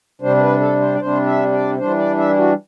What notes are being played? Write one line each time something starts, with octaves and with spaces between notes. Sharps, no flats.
C3 G3 D4 C5
C5
B4
A4
C5
D5
C3 G3 D4 C5
E5
D5
E3 G3 D4 C5
D5
E5
E4
F#4